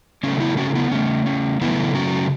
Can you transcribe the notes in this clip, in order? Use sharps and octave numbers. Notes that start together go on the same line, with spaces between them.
C#3 F#3 A3 C#4
B3 E4
C#4 F#4
F#4
B3 E4
C#3 A3 C#4
C#4
C#3 F#3 A3 B3 E4
C#4 F#4